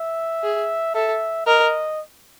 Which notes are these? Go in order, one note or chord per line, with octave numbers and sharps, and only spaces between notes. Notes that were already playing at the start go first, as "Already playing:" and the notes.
Already playing: E5
G#4
A4 E5
A#4 D#5